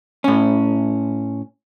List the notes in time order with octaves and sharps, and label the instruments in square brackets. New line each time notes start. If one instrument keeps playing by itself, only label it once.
[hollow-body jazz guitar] A2 C#4